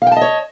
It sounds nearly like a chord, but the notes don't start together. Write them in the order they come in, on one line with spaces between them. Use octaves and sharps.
F5 G5 A5 D#5 C#5